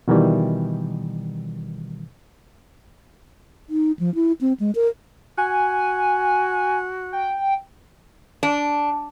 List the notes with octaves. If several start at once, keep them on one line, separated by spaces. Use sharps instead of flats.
B2 D#3 E3 G3
D#4
F3
E4
C4
G#3
A#4
F#4 G#5
G5
D4